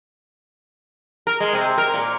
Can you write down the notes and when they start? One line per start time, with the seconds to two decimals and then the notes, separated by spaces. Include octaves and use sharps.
1.27 A#4
1.40 G#3
1.53 C3
1.78 A#4
1.94 A#2